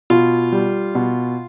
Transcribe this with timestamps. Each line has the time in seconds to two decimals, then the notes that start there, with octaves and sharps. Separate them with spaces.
0.10 B2 F4
0.52 G3
0.95 B2